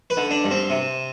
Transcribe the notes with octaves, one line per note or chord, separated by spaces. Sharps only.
B4
D3
D4
G2
C4
C3